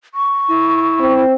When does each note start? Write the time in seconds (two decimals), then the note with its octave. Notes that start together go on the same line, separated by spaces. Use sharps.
0.15 C#6
0.49 E4
0.99 C4